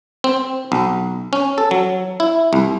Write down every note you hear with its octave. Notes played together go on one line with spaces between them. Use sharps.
C4
B1
C#4
A4
F#3
E4
C2